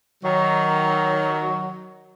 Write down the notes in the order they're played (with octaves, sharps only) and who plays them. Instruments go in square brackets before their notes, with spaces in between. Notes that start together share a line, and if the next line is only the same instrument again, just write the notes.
[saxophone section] D#3 F#3